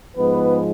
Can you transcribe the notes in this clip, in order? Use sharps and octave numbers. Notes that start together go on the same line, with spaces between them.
G#2 F3 G#3 B3 B4